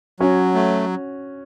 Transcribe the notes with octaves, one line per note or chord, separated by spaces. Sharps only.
F#3 C#4 F#4
A3